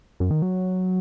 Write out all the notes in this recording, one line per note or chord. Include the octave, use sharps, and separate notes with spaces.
F#2
D#3
F#3